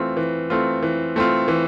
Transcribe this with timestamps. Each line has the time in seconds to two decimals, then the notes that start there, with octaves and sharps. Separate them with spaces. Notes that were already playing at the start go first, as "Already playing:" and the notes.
Already playing: E3 A3 C4 F4
0.17 E3
0.50 A3 C4 F4
0.82 E3
1.16 A3 C4 F4
1.48 E3